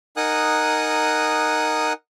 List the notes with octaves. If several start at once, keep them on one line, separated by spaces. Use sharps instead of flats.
D#4 A#4 F#5 G#5 D#6 F#6